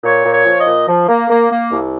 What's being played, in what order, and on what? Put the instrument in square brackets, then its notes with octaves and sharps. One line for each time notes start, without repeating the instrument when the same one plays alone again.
[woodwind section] A#2 C#5
A#2
C#5
F3
D#5
A#2
F3
A#3
A#3
A#3
C2